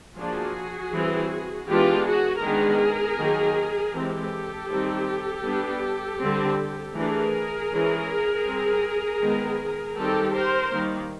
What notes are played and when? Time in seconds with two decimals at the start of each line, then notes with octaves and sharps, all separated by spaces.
0.17 F3 A#3 D4 F#4 G#4
0.93 E3 G3 C4
1.68 E3 G#3 B3 D4 F4 G4
2.07 F#4 G#4
2.43 D#3 G#3 B3 D4 G#4 A#4
3.19 D#3 F#3 A#3
3.94 E3 G#3 C4 G4 A4
4.70 D#3 G3 C4
5.45 G3 B3 D4
6.21 D3 G3 C4
6.95 E3 A3 D4 G#4 A#4
7.72 E3 G#3 C#4
8.46 G3 C4
9.21 D#3 G#3 B3
9.98 D#3 G3 C4 G4 A4
10.35 A#4 C5
10.72 D#3 G3 A#3